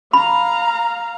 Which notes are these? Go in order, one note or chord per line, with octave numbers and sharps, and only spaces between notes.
F5 A#5 B5